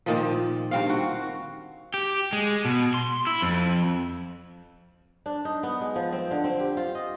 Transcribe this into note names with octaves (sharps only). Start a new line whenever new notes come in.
A#2 D#3 F3
G2 C4 F5
F#4
G4
G#3
B2
C6
E4
F2
D4
D#4
B3
G#3
F3
C4
D3
C4
G4
F4
D#5